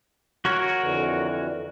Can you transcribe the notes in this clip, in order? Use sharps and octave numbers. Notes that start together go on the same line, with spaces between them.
F#4 A#4 C#5
F2 D3 E3